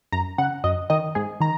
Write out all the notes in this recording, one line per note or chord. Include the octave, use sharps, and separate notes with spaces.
F#2 A#5
C#3 F#5
F#2 D#5
D#3 D#5
G#2 G#4
D#3 A#5